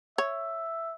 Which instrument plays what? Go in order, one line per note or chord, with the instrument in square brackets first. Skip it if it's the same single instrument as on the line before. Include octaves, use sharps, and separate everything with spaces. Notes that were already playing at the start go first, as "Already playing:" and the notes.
[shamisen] C#5 [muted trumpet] E5